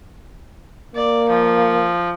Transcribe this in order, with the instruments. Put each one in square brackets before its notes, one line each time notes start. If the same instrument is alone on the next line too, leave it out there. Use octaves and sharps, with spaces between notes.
[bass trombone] A#3 [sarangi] D5
[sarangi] F3